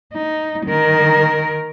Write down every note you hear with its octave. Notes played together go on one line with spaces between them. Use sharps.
D#4
D#3 A#4